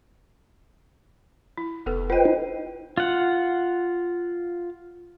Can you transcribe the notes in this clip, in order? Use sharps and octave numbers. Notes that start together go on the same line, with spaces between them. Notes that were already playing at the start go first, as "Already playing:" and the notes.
E4
F1 B3 A4 B4
F4 B4 C5 D#5 G5
D#4 E4
F4 F#5